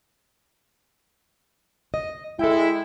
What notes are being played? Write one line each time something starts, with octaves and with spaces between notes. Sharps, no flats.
D#5
G#3 E4 A4 G5